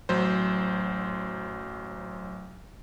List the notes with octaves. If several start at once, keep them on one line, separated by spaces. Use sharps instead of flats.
A1 F#3 C5